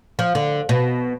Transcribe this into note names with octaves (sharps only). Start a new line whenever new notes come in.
F3
D3
B2